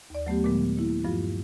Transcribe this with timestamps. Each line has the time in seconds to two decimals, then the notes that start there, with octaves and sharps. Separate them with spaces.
0.10 D#2 D5
0.26 F#3 A3 B3 G4
0.44 A#2 D#3 F#3 G#3 B3
0.77 A#3 E4
1.04 G2 F3 F4